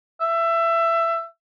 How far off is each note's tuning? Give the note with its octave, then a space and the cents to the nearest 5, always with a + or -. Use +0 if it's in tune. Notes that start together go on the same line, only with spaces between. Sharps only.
E5 +20